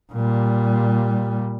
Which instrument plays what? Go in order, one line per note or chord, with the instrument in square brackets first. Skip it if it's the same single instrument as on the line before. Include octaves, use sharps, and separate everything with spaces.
[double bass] A#2 G3